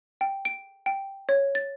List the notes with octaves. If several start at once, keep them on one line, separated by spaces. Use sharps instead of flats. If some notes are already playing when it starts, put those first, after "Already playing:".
G5
D7
G5
C#5
A6